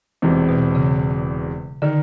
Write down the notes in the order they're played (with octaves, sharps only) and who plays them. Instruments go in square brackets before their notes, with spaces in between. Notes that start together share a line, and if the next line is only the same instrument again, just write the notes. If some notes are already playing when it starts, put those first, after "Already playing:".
[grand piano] E1 E2 C3
[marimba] B2
C#3
[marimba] D3 [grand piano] D#3